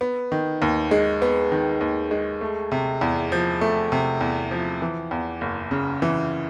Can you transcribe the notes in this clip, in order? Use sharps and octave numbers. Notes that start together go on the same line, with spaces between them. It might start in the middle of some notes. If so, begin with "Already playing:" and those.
B3
D#3
D#2
G#3
B3
D#3
D#2
G#3
A3
C3
E2
F3
A3
C3
E2
F3
E3
E2
F#1
C#3
E3